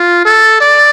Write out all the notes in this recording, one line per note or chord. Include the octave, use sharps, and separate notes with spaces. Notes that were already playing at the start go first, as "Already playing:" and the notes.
Already playing: F4
A4
D5